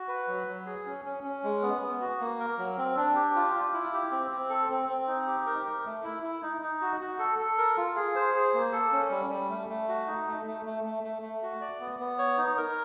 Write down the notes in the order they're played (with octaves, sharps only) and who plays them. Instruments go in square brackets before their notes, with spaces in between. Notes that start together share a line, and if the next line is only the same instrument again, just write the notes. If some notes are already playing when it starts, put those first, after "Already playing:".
Already playing: [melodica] F#4
B4
F#3
F#3
G#4
C#4
C#4
C#4
G#3
B3
B3
F#4
A#3
A#4
F#3
C4
D4
G4
F4
F4
E4
G4
C4
C4
A4
C4
C4
D#4
G4
A#4
A#4
A3
E4
E4
D#4
D#4
F#4
F#4
A4
A4
A#4
F4
G#4
C5
G#4
A#3
A4
C#4
G3
G3
A3
A3
F#4
D#4
A3
A3
A3
A3
A3
A3
F#4
D5
B3
B3
C#5
D#4
A#4